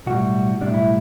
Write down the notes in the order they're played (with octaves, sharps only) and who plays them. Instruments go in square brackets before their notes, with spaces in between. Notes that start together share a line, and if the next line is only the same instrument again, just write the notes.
[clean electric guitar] B1 A2 G3 F#4
B1 A2 G3 D4
E4